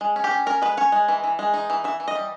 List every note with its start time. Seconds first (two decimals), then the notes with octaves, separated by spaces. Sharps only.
0.01 G#3
0.16 C#4
0.24 G4
0.31 C#4
0.46 C#4 A#4
0.62 G#3 B4
0.77 C#4 C#5
0.92 G#3
1.08 E3
1.24 E3
1.39 G#3
1.54 D#4
1.70 E3
1.84 E3 E5
2.00 E3
2.08 D#5
2.15 G3